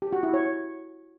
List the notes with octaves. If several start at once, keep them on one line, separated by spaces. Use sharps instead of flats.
G4
F#4
E4
C#5